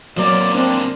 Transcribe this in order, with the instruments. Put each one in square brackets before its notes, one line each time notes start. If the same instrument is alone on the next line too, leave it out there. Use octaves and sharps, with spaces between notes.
[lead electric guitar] C3 A#3 [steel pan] F#3 [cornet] D5
[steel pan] C4 [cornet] D4